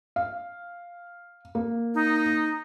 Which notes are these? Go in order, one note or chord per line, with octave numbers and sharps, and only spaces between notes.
F5
A#3
D#4